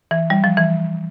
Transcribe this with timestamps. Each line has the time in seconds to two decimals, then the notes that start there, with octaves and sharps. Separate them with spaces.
0.11 E3
0.30 G3
0.44 F3
0.57 E3